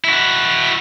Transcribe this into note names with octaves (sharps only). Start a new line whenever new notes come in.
E4 F#4